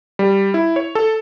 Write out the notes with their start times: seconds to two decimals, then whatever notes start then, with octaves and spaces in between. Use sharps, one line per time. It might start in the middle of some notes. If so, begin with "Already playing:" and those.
0.19 G3
0.54 E4
0.76 C#5
0.95 A4